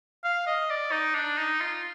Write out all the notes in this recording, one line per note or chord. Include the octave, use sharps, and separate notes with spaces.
F5
D#5
D5
D#4
D4
D#4
F4